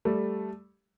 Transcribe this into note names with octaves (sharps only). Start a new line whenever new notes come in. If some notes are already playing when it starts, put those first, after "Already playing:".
G3 A3